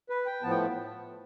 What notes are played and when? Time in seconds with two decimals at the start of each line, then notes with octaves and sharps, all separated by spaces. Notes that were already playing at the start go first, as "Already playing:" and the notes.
0.10 B4
0.26 G5
0.43 A2 F3 B3 A5
0.51 G5